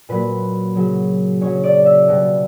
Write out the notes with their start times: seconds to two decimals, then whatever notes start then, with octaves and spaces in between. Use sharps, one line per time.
0.09 A#2 F#3 B4
0.75 C#3 F#3
1.41 C#3 F#3 C#5
1.64 D5
1.85 E5
2.08 B2 G3